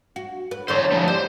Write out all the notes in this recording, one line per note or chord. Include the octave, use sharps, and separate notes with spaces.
F#4
B4
E2 D3 F#3 C5 C#5
F3 G3 A3
G3 C5